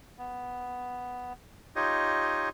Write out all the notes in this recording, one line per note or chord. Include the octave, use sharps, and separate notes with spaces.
B3
D#4 F4 G4 C#5 D#5